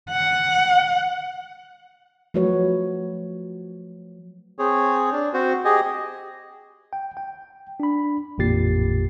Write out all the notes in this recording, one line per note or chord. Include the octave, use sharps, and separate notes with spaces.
F#5
F3 F#3 A3 F#4 B4 C#5
C4 G#4 C#5
D4
C4 F#4 C5
G4 G#4 D#5 G#5
G5
G5
D4 B5
A1 F2 A#2 G4 A6 C7